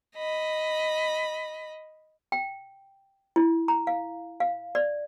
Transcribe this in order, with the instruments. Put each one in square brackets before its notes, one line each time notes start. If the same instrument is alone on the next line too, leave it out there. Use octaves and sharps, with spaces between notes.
[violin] D#5 B5
[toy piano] G5
E4
A#5
F5
F5
D5